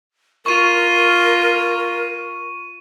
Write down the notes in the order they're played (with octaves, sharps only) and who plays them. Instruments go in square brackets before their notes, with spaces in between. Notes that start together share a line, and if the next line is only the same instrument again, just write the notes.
[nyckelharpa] F4 [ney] A#4 [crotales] C#6 D#7